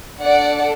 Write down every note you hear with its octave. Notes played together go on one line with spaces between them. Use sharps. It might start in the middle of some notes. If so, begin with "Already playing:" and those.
D4 A4 D5 F#5